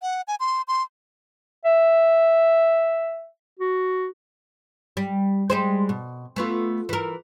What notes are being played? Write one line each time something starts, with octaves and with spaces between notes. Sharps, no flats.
F#5
G#5
C6
C6
E5
F#4
G3
G3 G#3 C5
B2
A3 B3 F4
E3 A#4